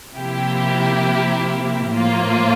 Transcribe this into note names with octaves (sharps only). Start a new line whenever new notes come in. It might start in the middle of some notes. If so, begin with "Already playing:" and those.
C3 F3 A#3 E4 G4
A2 F3 A#3 F4